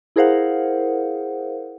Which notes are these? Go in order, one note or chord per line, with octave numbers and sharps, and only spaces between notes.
E4 G#4 A#4 C5 F5 F#5